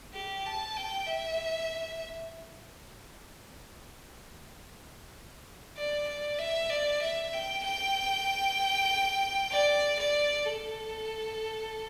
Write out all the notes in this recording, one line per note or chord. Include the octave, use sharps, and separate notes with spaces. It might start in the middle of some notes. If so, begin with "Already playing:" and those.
G4
A5
G5
E5
D5
D5
E5
D5
E5
G5
G5
D5
D5
A4